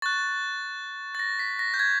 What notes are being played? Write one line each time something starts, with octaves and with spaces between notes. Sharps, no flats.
C#6 F#6 A6
A6
A#6
B6
A#6
G6
G#6